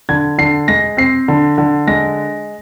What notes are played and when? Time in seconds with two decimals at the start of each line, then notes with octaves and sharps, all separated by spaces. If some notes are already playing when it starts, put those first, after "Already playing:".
0.09 D3 G#6
0.38 D3 C7
0.68 G#3 A#6
0.97 C4 C7
1.28 D3
1.58 D3
1.87 G#3 A#6